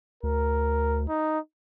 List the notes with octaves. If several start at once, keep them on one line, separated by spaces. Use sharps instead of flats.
D2 A#4
D#4